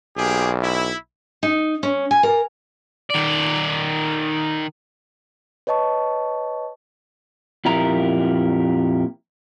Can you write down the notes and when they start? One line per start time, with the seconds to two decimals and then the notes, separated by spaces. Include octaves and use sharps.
0.17 B1 A#3 G4 G#4
0.63 E4
1.43 D#4
1.83 C#4
2.11 G#5
2.23 A#4
3.10 D#3 D5
5.67 B4 C#5 D#5 A5 C#6
7.65 F2 A#2 E4 G4 A#4 A#5